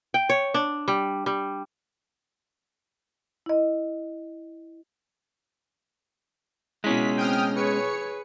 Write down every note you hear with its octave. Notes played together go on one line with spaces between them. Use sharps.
G5
C#5
D4
G3
G3
E4 D#5
B2 G#3 C#4 E4 B6
C4 G5 D#6 F6
G#4 B4 C#5 C#7